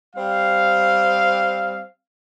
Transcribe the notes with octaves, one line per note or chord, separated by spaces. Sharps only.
G3 C4 F5